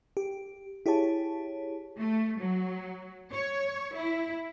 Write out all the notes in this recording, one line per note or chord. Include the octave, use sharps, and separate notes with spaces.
G4
E4 G4 G#4 C#5 A5
A3
F#3
C#5
E4